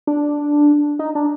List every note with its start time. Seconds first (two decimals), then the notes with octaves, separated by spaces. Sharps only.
0.07 D4
0.99 D#4
1.15 D4